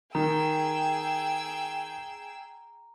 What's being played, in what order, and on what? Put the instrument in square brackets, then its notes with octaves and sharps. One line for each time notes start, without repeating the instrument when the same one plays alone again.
[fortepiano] D#3 [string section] G#4 G5 E6 [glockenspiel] A#5